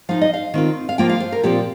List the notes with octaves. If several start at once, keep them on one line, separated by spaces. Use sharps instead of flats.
F3 D#4 F5
D#5
F5
D#3 C4 F4
F5
F3 A#3 F4 G5
F5
C5
A#4
A#2 F3 C4 G4